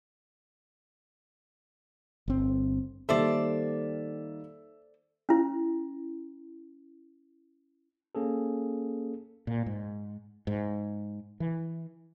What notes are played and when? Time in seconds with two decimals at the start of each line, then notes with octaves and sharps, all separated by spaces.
2.28 G1 C4
3.09 D#3 G3 A#3 A4 C5 D5 E5
5.29 C#4 E4
8.15 A#3 C#4 G#4 A4
9.47 A#2
9.66 G#2
10.47 G#2
11.40 E3